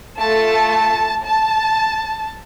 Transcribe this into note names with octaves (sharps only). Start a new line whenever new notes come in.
A3 F4 A4 A5
A5